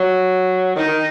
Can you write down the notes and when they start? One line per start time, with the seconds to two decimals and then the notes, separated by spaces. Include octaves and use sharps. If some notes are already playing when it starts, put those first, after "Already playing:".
Already playing: F#3
0.76 D#3 D#4
0.87 D#3